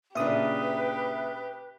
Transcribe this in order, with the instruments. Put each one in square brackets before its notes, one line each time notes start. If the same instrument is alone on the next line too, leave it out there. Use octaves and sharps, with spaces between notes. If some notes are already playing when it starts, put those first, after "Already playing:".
[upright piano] A#2 C#3 D4 [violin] G4 [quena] B4 [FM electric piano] E5 D#6